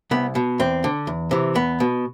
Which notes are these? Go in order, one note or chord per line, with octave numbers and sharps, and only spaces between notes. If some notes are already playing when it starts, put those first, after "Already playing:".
C2 B3
B2
E2 C4
D3
E2
C3 E3
E2 B3
B2